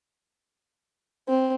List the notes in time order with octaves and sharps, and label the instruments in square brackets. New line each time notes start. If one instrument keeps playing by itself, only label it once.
[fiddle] C4